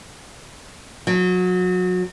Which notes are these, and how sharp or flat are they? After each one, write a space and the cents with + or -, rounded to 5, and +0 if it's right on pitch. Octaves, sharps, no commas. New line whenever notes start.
F#3 -25